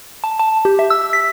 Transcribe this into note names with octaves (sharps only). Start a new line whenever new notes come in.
A5
A5
G4
E5
E6
B6